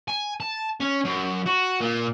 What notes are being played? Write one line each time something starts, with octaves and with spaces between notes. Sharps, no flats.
G#5
A5
C#4
F#2
F#4
A#2